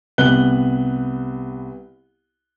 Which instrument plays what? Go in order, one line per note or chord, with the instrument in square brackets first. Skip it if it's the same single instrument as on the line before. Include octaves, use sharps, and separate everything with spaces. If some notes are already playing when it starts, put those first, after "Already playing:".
[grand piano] C2 B3 F#6 G7